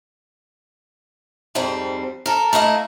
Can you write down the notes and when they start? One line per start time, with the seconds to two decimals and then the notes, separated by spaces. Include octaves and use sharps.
1.55 F2 G#2 G3 C4
2.26 A4 A#4
2.53 A3 A#3 E4 D#5